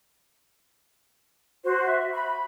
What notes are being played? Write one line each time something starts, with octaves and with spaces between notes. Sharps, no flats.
F#4 C5
E5
B5